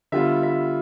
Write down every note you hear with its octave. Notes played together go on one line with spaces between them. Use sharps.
D3 G3 B3 F4 E5
E5